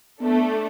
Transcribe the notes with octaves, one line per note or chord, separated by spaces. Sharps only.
A3 B3 D4 A4